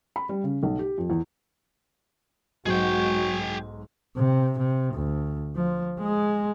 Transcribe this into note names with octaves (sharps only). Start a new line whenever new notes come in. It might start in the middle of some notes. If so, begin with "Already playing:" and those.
B5
G3
C#3
B1
G4
F2
E2
B1 G#2 F#3 G#3 F#4 G#4 G5
C3
C3
D2
F3
G#3